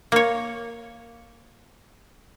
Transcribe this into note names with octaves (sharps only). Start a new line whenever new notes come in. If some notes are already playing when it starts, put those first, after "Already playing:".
A#3 C#5